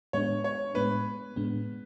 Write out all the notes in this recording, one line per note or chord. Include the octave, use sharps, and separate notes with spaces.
A2 G#3 B3 D4 C#5
C#5
A2 G#3 B3 D4 B4
A2 G#3 B3 D4